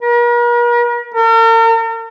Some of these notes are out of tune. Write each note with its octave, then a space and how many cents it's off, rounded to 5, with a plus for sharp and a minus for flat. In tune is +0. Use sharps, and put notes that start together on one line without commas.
A#4 +45
A#4 -40